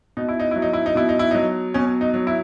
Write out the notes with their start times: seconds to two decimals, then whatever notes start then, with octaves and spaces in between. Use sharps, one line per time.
0.17 B2 D#4
0.29 E4
0.40 D#4
0.51 F#3 E4
0.62 D#4
0.73 E4
0.86 D#4
0.95 B2 E4
1.09 D#4
1.19 E4
1.31 F#3 D#4
1.74 B2 C#4
2.01 D#4
2.14 F#3
2.27 E4